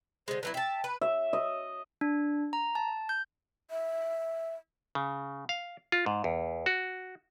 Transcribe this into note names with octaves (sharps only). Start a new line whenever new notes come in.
D3 G#3 C5
D3 F#3 E4 B4
E5 G5 A5
B4
E5
D#5
D4
A#5
A5
G6
E5
C#3
F5
F4
G#2
E2
F#4